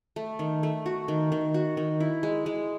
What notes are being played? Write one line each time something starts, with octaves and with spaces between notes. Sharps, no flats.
A3
D#3
A3
F#4
D#3
D#3
F#4
D#3
E4
G#3
G#3